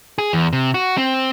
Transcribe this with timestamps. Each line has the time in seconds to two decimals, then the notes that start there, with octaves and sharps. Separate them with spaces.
0.18 G#4
0.33 E2
0.53 C3
0.74 F#4
0.97 C4